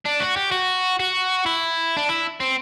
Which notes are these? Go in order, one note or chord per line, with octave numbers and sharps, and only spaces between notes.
D4
F#4
G4
F#4
F#4
E4
D4
E4
C4